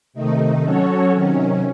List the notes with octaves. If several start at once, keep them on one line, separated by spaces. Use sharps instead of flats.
C3 D#3 A3 D#4
F#3 C#4 F#4 A4 C#5
C3 D#3 F#3 C#4